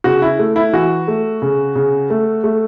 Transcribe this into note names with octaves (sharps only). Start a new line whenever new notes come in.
C#3 F#4
E4
A3
E4
E3 F#4
A3
C#3
C#3
A3
A3